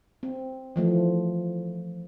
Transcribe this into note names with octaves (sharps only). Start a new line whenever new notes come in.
C4
E3 F3 A3